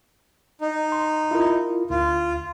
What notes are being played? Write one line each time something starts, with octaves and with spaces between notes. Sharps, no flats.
D#4
C6
E4 F4 A#4
D2 F4